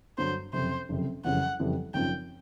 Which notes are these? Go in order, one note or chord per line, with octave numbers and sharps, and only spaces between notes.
G2 D3 F#3 C5
F#1 F2 C3 C5
F#1 F2 C3
F#1 F2 C#3 E3 G3 F#5
F#1 F2 C#3 E3 G3
G#1 F#2 C#3 F3 G5